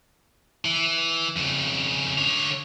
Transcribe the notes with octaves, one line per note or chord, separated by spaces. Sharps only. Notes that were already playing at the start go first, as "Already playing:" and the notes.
E3
F2 C#3
D3 C#5